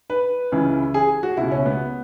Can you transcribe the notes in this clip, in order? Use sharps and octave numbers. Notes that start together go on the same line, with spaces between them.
B4
C#2 C#3 E3
G#4
F#4
C#2 B2 E4
C#4
B3